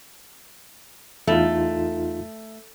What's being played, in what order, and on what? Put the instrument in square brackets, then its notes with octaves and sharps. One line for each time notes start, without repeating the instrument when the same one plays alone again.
[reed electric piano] E2 D#4 F4 [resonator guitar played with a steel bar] A3